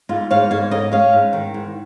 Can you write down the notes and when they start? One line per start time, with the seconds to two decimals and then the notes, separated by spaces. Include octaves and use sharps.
0.09 G#2 F4
0.30 G#2 C#5 F5
0.51 G#2 C#5 F5
0.71 C#4 A#4 D#5
0.92 C#4 C#5 F5
1.13 G#2
1.33 D#3
1.54 G#2